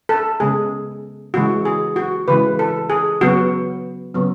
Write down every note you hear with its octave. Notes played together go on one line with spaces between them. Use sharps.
A4
C#3 G#3 B3 G#4
C#3 E3 G#3 F#4
G#4
F#4
C#3 E3 G#3 B4
A4
G#4
C#3 F#3 B3 F#4
C#3 F#3 B3